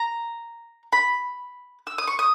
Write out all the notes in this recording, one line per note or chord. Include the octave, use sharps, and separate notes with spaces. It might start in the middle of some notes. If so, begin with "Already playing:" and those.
Already playing: A#5
B5
E6
D#6
C#6
D#6